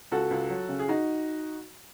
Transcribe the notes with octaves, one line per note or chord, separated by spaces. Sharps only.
C#2 F#4 A4
C#2
F#3
C#3
G#4
D#4 F#4